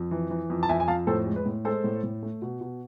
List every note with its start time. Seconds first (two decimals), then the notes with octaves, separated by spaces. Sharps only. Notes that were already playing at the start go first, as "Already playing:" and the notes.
Already playing: F2
0.11 E3
0.30 E3
0.50 F2
0.63 A5
0.69 F2 E5 G#5
0.80 G#5
0.88 F2 F5 A5
1.07 A2 A4 C5
1.27 G#3
1.36 B4
1.46 A2
1.65 G#3 A4 C5
1.84 A2
2.03 A2
2.23 A3
2.42 B2
2.61 B2